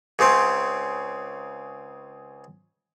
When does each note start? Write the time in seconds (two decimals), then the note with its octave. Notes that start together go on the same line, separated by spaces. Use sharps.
0.19 C#2 C#3 C4 C5